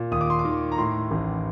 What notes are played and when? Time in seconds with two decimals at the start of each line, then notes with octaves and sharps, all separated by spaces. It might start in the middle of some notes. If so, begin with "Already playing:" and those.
Already playing: A#2
0.11 D#2 D#6
0.21 D6
0.30 C6
0.39 D6
0.45 D#3
0.72 A#5
0.78 A2 C6
1.11 A1